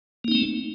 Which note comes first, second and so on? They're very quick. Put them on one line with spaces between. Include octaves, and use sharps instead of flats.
A#3 D#4 C4 A3